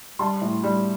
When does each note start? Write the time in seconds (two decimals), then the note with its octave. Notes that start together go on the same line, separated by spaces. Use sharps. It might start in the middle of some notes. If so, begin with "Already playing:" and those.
0.19 G3 A5 C6
0.42 A2
0.63 G3